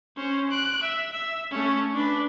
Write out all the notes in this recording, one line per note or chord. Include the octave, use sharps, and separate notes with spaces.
C#4 C5
F#6 D7
E5
E5
A3 C#4
D4 B4